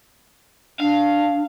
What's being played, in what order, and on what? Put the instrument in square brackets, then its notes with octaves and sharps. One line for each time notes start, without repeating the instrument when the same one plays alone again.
[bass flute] D4 [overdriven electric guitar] F5